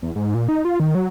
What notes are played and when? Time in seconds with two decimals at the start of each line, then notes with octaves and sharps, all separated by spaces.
0.03 E2
0.16 G#2
0.34 A#2
0.49 D#4
0.65 F4
0.80 D#3
0.95 F#3